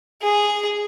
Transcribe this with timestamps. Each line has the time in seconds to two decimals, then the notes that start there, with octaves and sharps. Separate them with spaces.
0.22 G#4